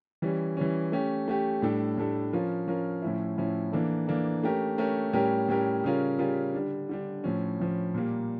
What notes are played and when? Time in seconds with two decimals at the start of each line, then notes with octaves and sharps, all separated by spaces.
0.22 E3 G3 C#4
0.57 E3 G3 C#4
0.92 A3 C#4 G4
1.28 A3 C#4 G4
1.62 A2 G3 D4 A4
1.97 A2 G3 D4 A4
2.32 F3 C#4 F4 A#4
2.68 F3 C#4 F4 A#4
3.02 A2 F3 C#4 E4
3.38 A2 F3 C#4 E4
3.72 E3 A#3 D4 A4
4.08 E3 A#3 D4 A4
4.43 A3 C#4 G4 A#4
4.78 A3 C#4 G4 A#4
5.13 A2 G3 C#4 G4 A#4
5.48 A2 G3 C#4 G4 A#4
5.84 C#3 G3 C#4 F4 A#4
6.19 C#3 G3 C#4 F4 A#4
6.54 D3 G3 D4
6.89 D3 G3 D4
7.24 A2 F3 C#4
7.60 A2 F3 C#4
7.94 A#2 G3 A#3